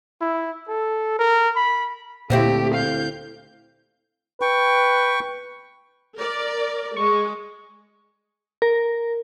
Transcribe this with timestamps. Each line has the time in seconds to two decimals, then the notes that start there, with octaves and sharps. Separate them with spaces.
0.21 E4
0.68 A4
1.19 A#4
1.56 B5
2.30 D2 A#2 A3 C4 E4 G4
2.74 F5 G6
4.41 B4 G5 C#6
6.17 A#4 D5
6.96 G#3 C#6
8.62 A#4